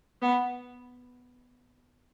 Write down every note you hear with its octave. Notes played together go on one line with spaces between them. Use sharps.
B3